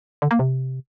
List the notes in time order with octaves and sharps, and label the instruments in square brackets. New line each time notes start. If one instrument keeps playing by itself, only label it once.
[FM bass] D3
A#3
C3